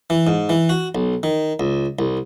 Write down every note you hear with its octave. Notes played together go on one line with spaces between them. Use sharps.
E3
G#2
E3
F#4
B1
D#3
C#2
C2